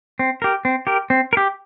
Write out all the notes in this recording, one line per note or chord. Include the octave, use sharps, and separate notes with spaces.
C4
G4 A#4
C4
G4 A#4
C4
A#4
G4